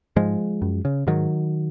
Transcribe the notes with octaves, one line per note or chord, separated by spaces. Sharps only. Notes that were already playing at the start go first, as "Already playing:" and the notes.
G#2 F3 G#3
F#2
C#3
G#2 D#3 F#3